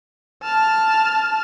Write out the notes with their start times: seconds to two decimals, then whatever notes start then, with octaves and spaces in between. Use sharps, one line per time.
0.43 A5 F6